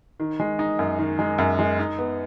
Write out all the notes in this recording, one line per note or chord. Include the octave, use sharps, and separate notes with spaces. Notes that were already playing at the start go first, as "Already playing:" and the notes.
D#3
G#3
D#4
F#2
D#3
G#3
F#2
G#3
D#4
B3